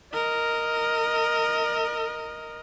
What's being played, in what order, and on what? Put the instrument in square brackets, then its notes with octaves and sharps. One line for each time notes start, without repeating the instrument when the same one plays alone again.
[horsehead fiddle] A#4 D#5